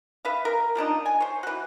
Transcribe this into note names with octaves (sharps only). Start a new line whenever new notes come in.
B4 E5 F5
A#4
F3 A#3 D4 D#4
G#5
C5 C#5
E3 F#4